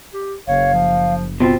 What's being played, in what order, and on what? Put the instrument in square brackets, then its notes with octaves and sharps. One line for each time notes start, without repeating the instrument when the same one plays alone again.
[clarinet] G4
[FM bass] F#1 [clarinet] C#5 [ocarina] F5
[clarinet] F3
[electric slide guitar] B2 C4 [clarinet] F4